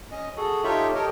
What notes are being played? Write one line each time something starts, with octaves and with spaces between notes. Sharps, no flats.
C#4 D#5
F#4 G#4 A4
D#4 F4 G4 A4 C#5 E5
G4 A4 A#4 C#5 D#5